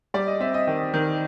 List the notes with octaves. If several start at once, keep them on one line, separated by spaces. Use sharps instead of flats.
G3 D5
D#5
C4 E5
D#5
D#3
D#3